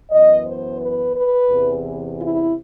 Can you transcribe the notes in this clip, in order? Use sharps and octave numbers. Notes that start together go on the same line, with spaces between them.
F#2 E3 B3 D#5
C5
B4
B4
E2 C3 E3
E4